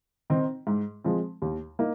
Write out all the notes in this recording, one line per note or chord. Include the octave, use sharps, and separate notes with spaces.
D#3 C4 D#4
G#2
F3 G#3 C4
D#2
A#3 D#4